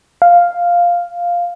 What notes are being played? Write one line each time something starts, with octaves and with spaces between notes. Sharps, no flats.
F5